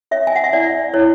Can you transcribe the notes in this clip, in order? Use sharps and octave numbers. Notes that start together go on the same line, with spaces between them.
C#5 E5
G#5
F#5
E5
E4 D5
E4 C#5